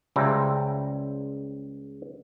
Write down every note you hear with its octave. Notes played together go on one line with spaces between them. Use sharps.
C#2 C#3 G3 C5 E5 A#5